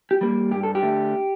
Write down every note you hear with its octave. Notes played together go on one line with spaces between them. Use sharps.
G4
G3 A#3
G2 G4
A4
G4
D3 A3